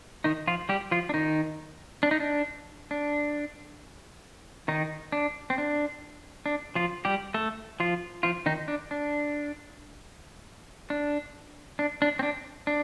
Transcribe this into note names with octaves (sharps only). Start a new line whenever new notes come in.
D#3 D#4
F3 F4
G3 G4
F3 F4
D4
D#3 D#4
D4
D#4
D4
D4
D#3 D#4
D4
C4
D4
D4
F3 F4
G3 G4
A3 A4
F3 F4
F3 F4
D#3 D#4
D4
D4
D4
D4
D4
C4
D4
D4